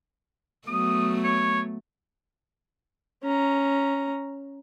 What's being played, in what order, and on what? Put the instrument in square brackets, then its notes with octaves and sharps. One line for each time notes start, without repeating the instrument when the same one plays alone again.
[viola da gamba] F#3 A3 B3 [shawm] D#6
[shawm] C#5
[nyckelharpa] C#4 A#5